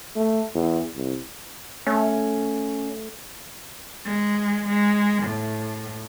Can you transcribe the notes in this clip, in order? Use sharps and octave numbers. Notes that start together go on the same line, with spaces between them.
A3
E2
C2
A3 C#4
G#3
G#3
A2